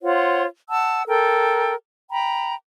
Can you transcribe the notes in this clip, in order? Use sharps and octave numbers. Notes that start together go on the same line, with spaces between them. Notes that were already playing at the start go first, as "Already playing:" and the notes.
F4 C5 C#5 F#5
F#5 A5 E6
A4 A#4 G5
G5 A#5 B5